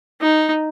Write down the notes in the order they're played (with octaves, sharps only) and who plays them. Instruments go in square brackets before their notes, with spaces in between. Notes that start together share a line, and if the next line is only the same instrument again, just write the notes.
[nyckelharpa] D#4